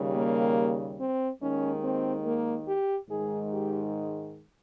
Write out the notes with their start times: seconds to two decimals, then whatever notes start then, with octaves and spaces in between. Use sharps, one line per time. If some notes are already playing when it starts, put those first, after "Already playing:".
Already playing: D#2 C#3 G3
0.15 A#3
0.99 C4
1.41 D#2 D#3 G#3 C#4
1.83 C4
2.24 A#3
2.67 G4
3.08 G#2 D#3 G#3 G#4
3.51 G4